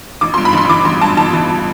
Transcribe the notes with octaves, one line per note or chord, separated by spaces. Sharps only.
A1 D6
C6
G2
B5
A1 C6
C6
E3 D6
A1 C6
G2 A5
A1 A5
E3